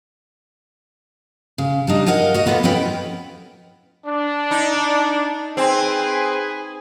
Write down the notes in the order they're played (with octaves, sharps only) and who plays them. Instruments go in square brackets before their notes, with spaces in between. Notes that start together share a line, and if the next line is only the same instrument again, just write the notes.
[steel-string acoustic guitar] C#3
G3 D4 D#4
A#4 D#5 F5 F#5 G#5
F#4 D#5
A#3 B3 F4 A4 B4
C#4 E4 A#4 B4 G5
[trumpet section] D4
[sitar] D#4
[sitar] C4 [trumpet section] G#4 B4 G#5